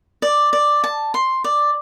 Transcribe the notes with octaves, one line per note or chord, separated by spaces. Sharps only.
D5
D5
A5
C6
D5